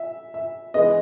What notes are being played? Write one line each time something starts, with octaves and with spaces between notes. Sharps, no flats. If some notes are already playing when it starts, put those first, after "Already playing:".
Already playing: E5
E5
E3 G#3 B3 D#5